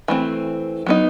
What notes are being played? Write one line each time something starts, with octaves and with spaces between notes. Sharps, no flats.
E3 A3 C4
F#3 B3 D#4